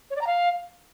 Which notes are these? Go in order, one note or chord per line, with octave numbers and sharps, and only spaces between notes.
C#5
D5
A#5
F5